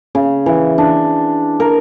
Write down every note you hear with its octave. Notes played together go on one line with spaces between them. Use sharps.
C#3
E3
D4
A#4